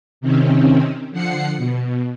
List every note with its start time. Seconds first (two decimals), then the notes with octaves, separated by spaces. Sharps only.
0.21 C3 D#3 C4 C#4
1.11 D3 F3 F#5 C7 C#7
1.57 B2